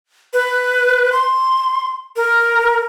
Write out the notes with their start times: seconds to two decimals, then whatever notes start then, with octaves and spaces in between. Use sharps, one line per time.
0.33 B4
1.12 C6
2.16 A#4